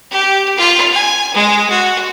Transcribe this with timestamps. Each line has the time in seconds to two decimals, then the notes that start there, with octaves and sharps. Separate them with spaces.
0.11 G4
0.57 F4
0.93 G#5
1.34 G#3
1.70 F#4